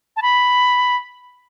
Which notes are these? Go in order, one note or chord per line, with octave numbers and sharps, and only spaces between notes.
A5
B5